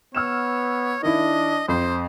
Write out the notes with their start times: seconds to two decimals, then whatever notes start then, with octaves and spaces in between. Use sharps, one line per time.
0.15 B3 C#5 E6 F6 E7
1.03 D#3 D4 E4 D#5
1.69 F2 C5